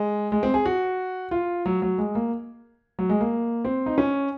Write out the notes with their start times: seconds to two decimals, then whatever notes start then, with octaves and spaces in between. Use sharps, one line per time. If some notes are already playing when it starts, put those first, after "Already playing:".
Already playing: G#3
0.32 G#3
0.43 C4
0.54 G#4
0.66 F#4
1.31 F4
1.66 F#3
1.82 F#3
1.98 G#3
2.15 A#3
2.99 F#3
3.10 G#3
3.21 A#3
3.65 C4
3.86 D#4
3.98 C#4